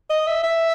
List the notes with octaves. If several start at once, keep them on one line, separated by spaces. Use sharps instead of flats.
D#5
E5
E5